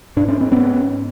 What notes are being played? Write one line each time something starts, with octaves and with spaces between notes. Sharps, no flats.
G#2 D4
C#4
C4
B3 C#4